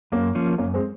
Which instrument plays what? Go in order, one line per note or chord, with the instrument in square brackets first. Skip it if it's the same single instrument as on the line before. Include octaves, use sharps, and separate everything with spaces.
[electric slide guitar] F#2 [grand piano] A#3 C#4
[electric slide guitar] F3 A#3 C#4
[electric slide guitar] F#2 [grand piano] A#3 C#4
[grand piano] G#3 C4